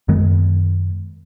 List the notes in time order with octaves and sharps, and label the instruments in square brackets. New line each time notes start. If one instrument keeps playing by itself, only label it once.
[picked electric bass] F#2 D#3 G#3 B3